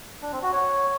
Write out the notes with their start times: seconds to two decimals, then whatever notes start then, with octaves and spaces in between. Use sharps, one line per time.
0.22 D4
0.32 C4
0.42 F#4
0.52 C#5